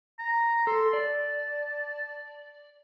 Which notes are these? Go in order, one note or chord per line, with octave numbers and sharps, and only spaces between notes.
A#5
A4 C6
D5 A5